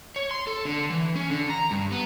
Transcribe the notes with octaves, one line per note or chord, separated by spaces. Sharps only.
C#5
C6
A4
D3
E3
C#4
D3
A#5
G2
B3